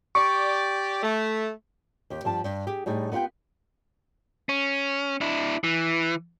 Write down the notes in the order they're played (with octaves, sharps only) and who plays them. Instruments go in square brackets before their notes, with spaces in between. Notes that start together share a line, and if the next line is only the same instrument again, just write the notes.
[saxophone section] G4 D5 [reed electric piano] C#6
[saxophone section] A3
[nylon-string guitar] D#2 G4
G2 F3 G4 A5
G2
G4 G#4
A2 G3 D#4 G#4
B3 D#4 F4 G4 G5
[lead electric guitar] C#4
D4 E4
E3